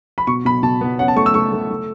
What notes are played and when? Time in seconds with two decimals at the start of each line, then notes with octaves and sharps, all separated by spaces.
0.18 B5
0.27 B2 C#6
0.45 B2 B5
0.63 B2 A5
0.81 B3
0.99 C#4 F#5
1.08 A5
1.16 A3 C#6
1.26 E6
1.34 A3 C#6
1.52 A3
1.69 A3